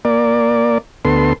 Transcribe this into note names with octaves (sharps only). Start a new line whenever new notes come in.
A#3 D5
D2 B3 A4 C6